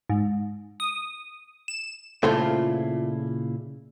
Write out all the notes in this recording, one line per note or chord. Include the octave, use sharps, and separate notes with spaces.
G#2
D#6
E7
A#2 C#3 A3 E4 F4 C5